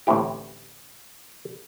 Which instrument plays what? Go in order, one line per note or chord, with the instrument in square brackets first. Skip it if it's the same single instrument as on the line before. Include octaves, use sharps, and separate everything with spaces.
[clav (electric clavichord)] A1 D2 A2 C4 E4 G4